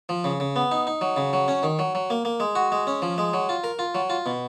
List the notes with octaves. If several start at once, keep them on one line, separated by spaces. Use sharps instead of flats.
F3
C#3
C#3
B3
D#4
D#4
F#3
C#3
F#3
C#4
D#3
F#3
F#3
A#3
A#3
G#3
F#4
G#3
C#4
F3
G#3
F#3
F4
A#4
F4
F#3
F4
B2